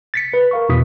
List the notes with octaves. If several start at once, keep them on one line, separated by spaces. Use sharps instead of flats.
A6 B6 C#7
B4
A#4 F5 C#6
E2 B2 E4 D#6 B6